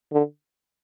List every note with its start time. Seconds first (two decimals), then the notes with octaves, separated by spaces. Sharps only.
0.12 D3